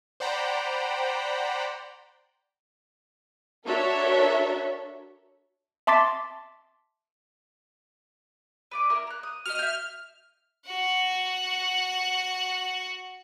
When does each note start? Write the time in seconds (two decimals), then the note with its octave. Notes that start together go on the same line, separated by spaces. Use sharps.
0.20 C5 D5 F#5 G5 A#5 B5
3.66 D4 F#4 A4 A#4 C#5 E5
5.87 E5 A5 C6 D6 A6 B6
8.71 B4 D5 D6
8.90 E4 A#4 E6
9.07 A#5 F#6
9.23 D#6
9.46 F#4 B4 D#5 F6
9.59 E5 G6
10.67 F#4 F#5